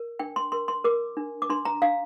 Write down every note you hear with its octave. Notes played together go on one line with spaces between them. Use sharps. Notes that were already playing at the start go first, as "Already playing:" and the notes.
Already playing: A#4
D4 G5
C6
A#4 C6
C6
A#4 D6
D4
D6
D4 C6
A#5
D4 F5